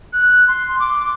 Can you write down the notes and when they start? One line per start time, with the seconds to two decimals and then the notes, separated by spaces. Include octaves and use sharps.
0.13 F#6
0.48 C6
0.80 D6